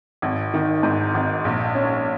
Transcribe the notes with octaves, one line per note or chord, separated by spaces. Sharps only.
G#1
D#3
G#2
G#1
A#1
C#4